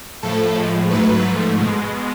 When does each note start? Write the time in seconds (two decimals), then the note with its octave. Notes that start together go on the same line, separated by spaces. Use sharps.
0.23 A2 F3 A3 A4
0.57 A2 F3 G#3
0.90 G#2 F#3 A3 B4
1.25 G#2 F3 A3
1.59 B2 G#3